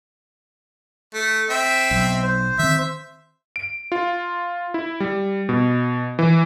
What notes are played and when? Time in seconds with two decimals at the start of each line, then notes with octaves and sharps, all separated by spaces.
1.14 A3
1.50 C4 E5
1.91 B1
2.23 C5
2.59 D#3 C4 E5
3.56 D7
3.92 F4
4.74 E4
5.00 G3
5.49 B2
6.19 E3